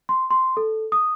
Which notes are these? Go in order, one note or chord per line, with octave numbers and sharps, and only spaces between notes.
C6
C6
A4
D#6